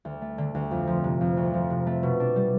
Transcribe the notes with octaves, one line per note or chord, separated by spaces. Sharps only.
D2
A3
D3
D2
F2
F3
C3
F2
D2
F3
C3
A3
B2
D4
G3